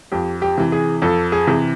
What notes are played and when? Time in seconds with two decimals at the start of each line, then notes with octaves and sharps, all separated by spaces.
0.12 F2 G4
0.42 G4
0.58 C3 E3
0.72 G#4
1.02 F2 A4
1.32 G#4
1.47 C3 E3